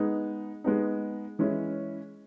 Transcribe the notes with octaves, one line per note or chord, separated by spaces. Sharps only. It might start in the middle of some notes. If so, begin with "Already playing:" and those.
Already playing: G#3 B3 D#4
G#3 B3 D#4
E3 G#3 C#4 E4